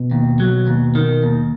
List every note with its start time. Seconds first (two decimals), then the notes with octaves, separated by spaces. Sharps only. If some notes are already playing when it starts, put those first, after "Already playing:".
Already playing: B2
0.11 D#2
0.40 F#3
0.67 D#2
0.95 D#3
1.23 D#2